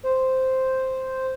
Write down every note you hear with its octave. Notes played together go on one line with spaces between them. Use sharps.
C5